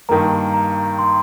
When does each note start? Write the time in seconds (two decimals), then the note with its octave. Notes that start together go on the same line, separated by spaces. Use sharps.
0.09 G2 D#3 A#3 A#5
0.54 A#5
0.99 C6